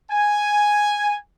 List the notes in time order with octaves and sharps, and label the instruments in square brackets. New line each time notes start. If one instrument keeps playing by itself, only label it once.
[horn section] G#5